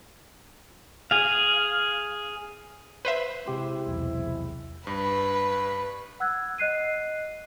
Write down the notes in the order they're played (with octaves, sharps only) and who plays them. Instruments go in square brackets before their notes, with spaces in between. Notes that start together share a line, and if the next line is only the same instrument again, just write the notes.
[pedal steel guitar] G#4 F5
[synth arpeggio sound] B4 C5 E5
[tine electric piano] C3 G4 C6 [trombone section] G#3 C4 E4
[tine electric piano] B1 E2 C3
[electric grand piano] G2 [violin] B4
[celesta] F#5 E6 F#6 G#6
D#5 F#6 C7 D#7